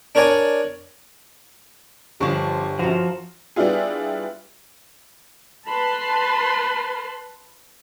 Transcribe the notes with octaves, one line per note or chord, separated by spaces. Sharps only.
D4 A#4 C#5 D5 G#5
G1 F3 D4 G4 C#6
F#2 F3 F#4
G3 B3 D4 E4 F4 G#4
B4 A5 B5 C6